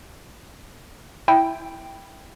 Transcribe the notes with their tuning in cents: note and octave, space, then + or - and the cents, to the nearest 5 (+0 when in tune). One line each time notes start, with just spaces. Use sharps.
E4 +0 G5 +0